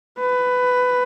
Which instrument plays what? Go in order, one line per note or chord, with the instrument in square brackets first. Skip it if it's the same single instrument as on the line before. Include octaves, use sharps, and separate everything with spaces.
[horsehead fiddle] B4